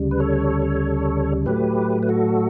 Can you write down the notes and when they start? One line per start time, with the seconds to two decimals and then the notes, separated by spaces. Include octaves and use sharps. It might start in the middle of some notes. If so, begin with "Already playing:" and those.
Already playing: D2 C#3 G3
0.11 B4
0.20 A4 C#5
1.46 A2 F#3 A3 G4 B4
2.03 B4
2.09 F#4 A4